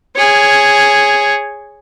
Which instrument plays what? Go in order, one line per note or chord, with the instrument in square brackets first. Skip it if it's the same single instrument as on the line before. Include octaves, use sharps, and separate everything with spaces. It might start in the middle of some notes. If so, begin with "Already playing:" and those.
[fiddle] G#4 C#5